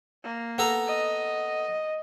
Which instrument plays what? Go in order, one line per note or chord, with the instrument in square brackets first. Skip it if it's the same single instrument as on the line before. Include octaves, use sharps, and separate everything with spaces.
[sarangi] A#3
[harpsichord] B3 A4 A#5
[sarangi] D#5